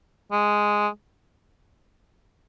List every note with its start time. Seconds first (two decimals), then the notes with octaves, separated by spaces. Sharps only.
0.32 G#3